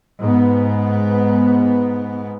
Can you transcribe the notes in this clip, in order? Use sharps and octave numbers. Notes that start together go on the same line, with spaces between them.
G#2 B3